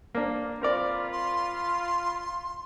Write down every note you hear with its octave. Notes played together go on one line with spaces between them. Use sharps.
A#3 D4
C4 F4 A#4 D5 B5
C6